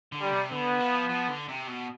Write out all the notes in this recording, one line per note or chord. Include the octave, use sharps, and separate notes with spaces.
D3
G3
C3
D3 B3
F3
F3
D3
C3
B2